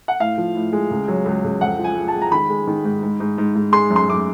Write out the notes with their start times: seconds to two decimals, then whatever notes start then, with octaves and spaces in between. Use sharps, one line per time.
0.08 F#5
0.20 A2 F5
0.38 F3
0.55 A2
0.73 G#3
0.91 C#2
1.08 F#3
1.26 C#2
1.44 C#2
1.61 F2 F#5
1.79 F3
1.84 G#5
1.96 G#3
2.08 A5
2.14 G#3
2.22 A#5
2.32 D#3 B5
2.49 G#3
2.67 D#3
2.84 G#2
3.02 G#2
3.20 G#2
3.38 G#2
3.55 G#2
3.72 G#3 C6
3.90 F#2
3.96 C6
4.08 F#2 D6